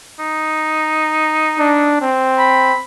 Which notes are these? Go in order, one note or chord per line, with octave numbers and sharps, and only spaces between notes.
D#4
D4
C4
B5